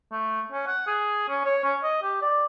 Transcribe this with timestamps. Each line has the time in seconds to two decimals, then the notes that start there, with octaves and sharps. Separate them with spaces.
0.12 A3
0.52 C#4
0.67 F#5
0.87 G#4
1.29 C#4
1.45 C#5
1.64 C#4
1.83 D#5
2.03 G4
2.22 D5